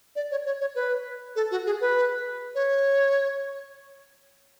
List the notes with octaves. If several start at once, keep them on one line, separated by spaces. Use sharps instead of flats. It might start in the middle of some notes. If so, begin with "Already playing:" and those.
D5
C#5
C#5
C#5
B4
A4
F#4
G#4
B4
C#5